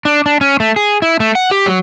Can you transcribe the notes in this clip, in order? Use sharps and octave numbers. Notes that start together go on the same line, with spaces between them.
D4
D4
C#4
A3
G#4
E4
A3
F#5
G4
F#3